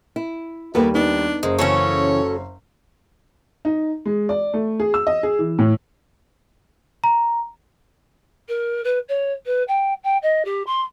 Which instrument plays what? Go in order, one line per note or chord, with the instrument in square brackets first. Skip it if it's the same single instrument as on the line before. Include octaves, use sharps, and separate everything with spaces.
[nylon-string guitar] E4
[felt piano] D#2 G3 [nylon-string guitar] A#3 A4 B4 [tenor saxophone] B3
[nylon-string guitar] B3 D#4 [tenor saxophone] D4
[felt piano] F#1 C5 [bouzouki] G#3
[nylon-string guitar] C#3 E3 [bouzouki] C#4 F#4 A4 [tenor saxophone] C#5
[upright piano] D#4
G#3
D5
A3
G#4
E6
D#5
G#4
E3
A2
[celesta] A#5
[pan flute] A#4
B4
C#5
B4
G5
G5
D#5
G4
C6